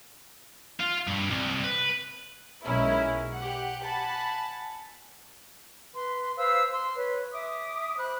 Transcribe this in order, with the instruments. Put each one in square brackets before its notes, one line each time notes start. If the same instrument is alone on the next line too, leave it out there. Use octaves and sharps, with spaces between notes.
[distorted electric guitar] F4
G2
C2
B4
[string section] B1 G#3 C#4 E4 A#4
G4 F#5
F#5 G#5 A5 B5
[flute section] B4 C6
B4 C5 F5 E6
C6
B4 C#5
E5 D6 D#6
C5 B5 F#6